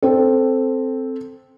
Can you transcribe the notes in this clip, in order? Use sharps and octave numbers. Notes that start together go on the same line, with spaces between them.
C4 A4